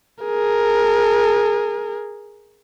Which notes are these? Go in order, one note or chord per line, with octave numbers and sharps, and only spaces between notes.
G#4 A#4